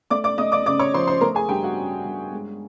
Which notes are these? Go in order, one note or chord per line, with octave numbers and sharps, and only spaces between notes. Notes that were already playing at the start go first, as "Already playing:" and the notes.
A3 D5 D6
D5 D6
A3 D#5 D#6
D5 D6
C#3 D5 D6
C#5 C#6
F3 C5 C6
C5 C6
A3 A#4 A#5
G#4 G#5
G2 G4 G5
F#4 F#5
C#4
G2
G#3